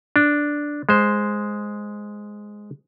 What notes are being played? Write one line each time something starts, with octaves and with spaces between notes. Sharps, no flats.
D4
G#3 C5